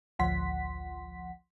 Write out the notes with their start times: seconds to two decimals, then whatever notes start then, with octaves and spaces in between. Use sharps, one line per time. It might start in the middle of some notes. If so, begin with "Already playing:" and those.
0.19 A1 D2 F3 F#5 C6 B6